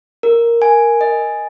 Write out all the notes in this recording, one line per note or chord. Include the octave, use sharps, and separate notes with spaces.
A#4
G#5
D#5